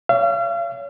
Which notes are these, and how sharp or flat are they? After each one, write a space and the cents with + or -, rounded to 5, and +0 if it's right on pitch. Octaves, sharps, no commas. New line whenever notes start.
C#5 +30 F5 -40